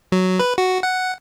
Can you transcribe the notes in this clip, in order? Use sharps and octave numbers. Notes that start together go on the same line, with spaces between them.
F#3
B4
F#4
F#5